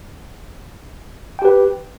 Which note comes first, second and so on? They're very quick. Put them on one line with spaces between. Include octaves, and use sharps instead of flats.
G5 G4 B4